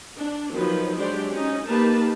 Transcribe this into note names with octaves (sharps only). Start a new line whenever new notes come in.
D4
D#3 F3 F#3 B4
F#3 G#3 D4 G4 C5 D5
C#4 D#4
A#3 D#4 G4 A#4 B4 A5